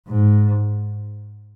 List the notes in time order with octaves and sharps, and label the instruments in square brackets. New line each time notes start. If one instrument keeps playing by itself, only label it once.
[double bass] G#2